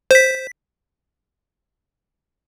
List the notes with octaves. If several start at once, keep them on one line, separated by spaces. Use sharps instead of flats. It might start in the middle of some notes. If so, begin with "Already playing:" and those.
C5 B6